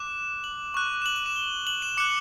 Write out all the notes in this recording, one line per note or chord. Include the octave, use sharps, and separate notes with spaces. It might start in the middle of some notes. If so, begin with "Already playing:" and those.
Already playing: D6 F#6 E7
F#7
C#6 F#6
E7
F#7
F#7
E7
G7
F#7
E7
D6 F#6 C#7